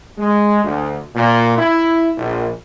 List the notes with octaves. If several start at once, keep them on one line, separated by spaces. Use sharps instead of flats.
G#3
D2
A#2
E4
A#1